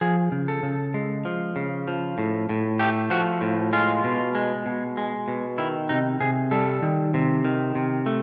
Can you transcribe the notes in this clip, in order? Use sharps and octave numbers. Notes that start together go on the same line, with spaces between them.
F3 G#4
C#3
A4
C#3
G#3
F3
C#3
F3
A2
A2
A3 G4
F3 F#4
A2
G#3 F4
B2
G#3
B2
G#3
B2
D#3 E4
C3 D#4
C3 G#4
G3 A4
D#3
C3
D#3
C3
A3